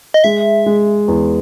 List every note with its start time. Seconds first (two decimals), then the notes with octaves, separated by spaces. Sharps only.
0.14 D#5
0.24 G#3 E5
0.66 G#3
1.08 E2